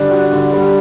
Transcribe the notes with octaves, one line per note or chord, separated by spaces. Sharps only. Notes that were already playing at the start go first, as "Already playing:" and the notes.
Already playing: D3 G3 D4
F#4
D3
G3